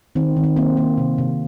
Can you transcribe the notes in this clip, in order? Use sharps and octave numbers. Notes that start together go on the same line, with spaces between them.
D#3 C4
D#3
C4
A#3 C4
A#3
C3
C3